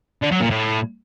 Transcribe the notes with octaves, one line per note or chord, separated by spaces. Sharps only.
D3
F#3
A#2
A2